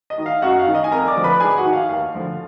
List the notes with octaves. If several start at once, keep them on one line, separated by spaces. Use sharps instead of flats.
D#5
D#3
F5
F#2 F#4 F#5
F5
D#3
D#5
G#5
F2 A#4 A#5
D5 D6
D3 F3
B4 B5
G#2 G#4 G#5
F#4 F#5
D#3
F5
D#2 F5
D3 F3